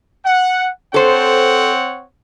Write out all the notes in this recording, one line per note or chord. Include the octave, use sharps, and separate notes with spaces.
F#5
C4 A4 C5 C#5 F#5